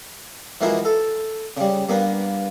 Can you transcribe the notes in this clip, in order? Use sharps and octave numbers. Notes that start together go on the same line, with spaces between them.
E3 F3 G#3 A#3 E4 F#4
A4
C#3 G3
G2 A#3 B3